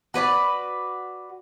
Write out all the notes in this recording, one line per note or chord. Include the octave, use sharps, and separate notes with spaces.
F#4 B4 C#5 D5